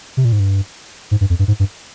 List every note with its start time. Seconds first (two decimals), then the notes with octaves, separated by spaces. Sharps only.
0.17 C3
0.25 A#2
0.32 G#2
0.40 G2
1.11 G#2
1.21 G2
1.30 F2
1.39 G2
1.48 G#2
1.60 G2